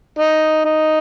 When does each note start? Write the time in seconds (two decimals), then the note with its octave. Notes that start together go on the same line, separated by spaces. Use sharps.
0.19 D#4
0.65 D#4